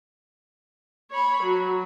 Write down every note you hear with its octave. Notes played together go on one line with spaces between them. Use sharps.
C#5 B5
F#3